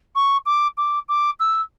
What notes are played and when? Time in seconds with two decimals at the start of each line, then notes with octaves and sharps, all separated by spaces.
0.15 C#6
0.46 D6
0.77 D6
1.09 D6
1.40 E6